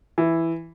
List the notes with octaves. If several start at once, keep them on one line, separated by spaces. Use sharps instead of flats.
E3